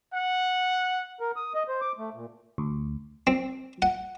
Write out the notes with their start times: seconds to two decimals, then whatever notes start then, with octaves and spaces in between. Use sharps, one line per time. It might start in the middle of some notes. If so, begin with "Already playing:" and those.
0.12 F#5
1.20 A#4
1.36 D#6
1.55 D#5
1.68 C5
1.81 D6
1.98 A3
2.14 A#2
2.58 D2
3.27 C4
3.82 F#5